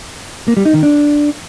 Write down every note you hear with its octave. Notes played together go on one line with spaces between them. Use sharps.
A#3
G3
D#4
D#3
D4